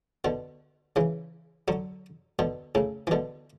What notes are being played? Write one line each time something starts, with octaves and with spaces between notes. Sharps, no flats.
B2 D3
C#3 E3
D3 F#3
B2 D3
A2 C#3
E3
B2 D3